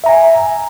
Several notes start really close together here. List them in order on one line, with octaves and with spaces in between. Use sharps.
E5 A#5 G#5